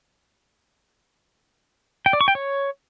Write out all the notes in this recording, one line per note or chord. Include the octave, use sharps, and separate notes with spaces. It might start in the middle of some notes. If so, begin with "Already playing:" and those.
G5
D5
C#6
G5
C#5